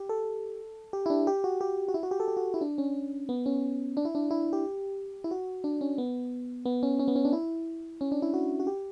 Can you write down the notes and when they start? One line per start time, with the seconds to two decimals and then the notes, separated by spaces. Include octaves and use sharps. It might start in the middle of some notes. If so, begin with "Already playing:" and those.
Already playing: G4
0.09 A4
0.93 G4
1.06 E4
1.10 D4
1.27 G4
1.44 F#4
1.61 G4
1.88 F#4
1.94 E4
2.03 F#4
2.11 G4
2.20 A4
2.28 G4
2.37 F#4
2.54 E4
2.61 D4
2.78 C#4
3.29 B3
3.46 C#4
3.97 D4
4.05 E4
4.15 D4
4.31 E4
4.53 G4
5.24 E4
5.31 F#4
5.64 D4
5.81 C#4
5.98 B3
6.65 B3
6.83 C#4
6.99 C#4
7.08 B3
7.16 C#4
7.25 D4
7.33 E4
8.01 C#4
8.12 D4
8.22 E4
8.34 F#4
8.60 F#4
8.67 G4